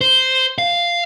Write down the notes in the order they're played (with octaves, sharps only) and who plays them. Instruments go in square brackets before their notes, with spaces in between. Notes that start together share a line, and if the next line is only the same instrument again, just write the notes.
[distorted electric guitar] C5
F5